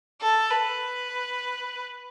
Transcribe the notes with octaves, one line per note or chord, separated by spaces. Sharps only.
A4
B4